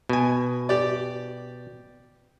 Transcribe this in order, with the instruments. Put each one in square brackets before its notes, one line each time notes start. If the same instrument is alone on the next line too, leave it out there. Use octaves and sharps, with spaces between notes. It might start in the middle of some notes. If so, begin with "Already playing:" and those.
[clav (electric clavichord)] B2 G#5
[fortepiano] G4 D5